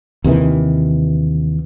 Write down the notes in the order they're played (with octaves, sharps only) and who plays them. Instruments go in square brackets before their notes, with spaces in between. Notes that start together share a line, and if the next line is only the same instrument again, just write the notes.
[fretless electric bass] D#2 C3 D#3 E3